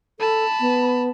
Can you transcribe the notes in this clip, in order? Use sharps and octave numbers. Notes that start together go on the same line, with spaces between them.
A4 A5 B5
B3